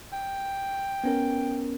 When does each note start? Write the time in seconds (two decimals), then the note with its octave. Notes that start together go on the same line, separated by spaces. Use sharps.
0.13 G5
1.04 B3 C#4 A#4